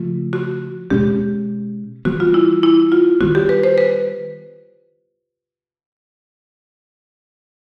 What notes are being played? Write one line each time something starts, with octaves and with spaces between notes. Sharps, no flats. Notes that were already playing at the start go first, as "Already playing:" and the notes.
Already playing: C#3 F3 A3 F4
F#4
B2 G#3 C#4 G4
E3 G3 B3 F#4
F4
E4
E4
F4
D#3 G3 B3 F#4
G4
B4
C5
B4